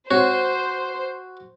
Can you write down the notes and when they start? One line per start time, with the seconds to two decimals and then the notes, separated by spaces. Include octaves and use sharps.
0.11 G#2 C4 F#4 C5 C#5